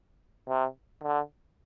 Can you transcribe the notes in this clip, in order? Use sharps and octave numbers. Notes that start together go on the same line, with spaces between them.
C3
D3